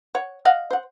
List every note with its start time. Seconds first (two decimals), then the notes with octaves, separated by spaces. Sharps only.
0.15 C#5 F#5
0.45 D#5 F5 F#5
0.71 C5 F#5